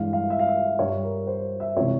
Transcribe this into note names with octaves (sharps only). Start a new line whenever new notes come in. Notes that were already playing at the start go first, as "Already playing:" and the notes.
Already playing: G2 E3 G#3 F5
F5
E5
F5
E5
G2 G3 C#5
A#4
C5
E5
C3 E3 G#3 C#5